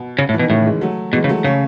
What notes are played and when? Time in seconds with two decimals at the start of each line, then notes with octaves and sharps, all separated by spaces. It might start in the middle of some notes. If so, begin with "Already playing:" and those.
Already playing: B2
0.19 C#3
0.29 A2
0.34 E3
0.39 B2
0.42 D#3
0.50 A2 C#3
0.66 E3 G#3
0.81 F#3 A3
1.13 B2 E3 G#3
1.24 C#3
1.29 F#3 A3
1.44 C#3 A3 C#4